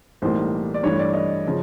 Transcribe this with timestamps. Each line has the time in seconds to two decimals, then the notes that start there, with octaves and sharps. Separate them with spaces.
0.22 B1 A2 E3 G3 A#3 C5
0.74 D5
0.83 G2 E3 A3 C#5
0.99 D5
1.13 D#5
1.47 C#3 F3